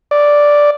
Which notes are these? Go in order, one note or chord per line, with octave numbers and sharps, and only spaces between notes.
D5